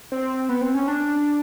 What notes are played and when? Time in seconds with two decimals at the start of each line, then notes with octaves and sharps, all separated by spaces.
0.12 C4
0.49 B3
0.61 C4
0.74 C#4
0.88 D4